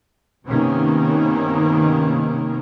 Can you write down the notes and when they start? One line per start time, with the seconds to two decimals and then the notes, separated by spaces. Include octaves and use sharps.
0.45 G2 C3 D#3 A#3 B3 C#4